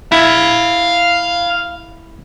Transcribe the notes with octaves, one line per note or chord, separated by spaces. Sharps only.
E4 F5 B5